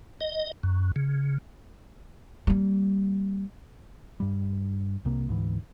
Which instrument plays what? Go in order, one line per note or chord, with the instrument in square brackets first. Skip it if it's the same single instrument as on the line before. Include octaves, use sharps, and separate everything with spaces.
[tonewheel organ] D#5
F#2
C#3
[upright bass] G3 A#3
[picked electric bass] G2 G3
C2 C3 A#3
D2 G#2 E3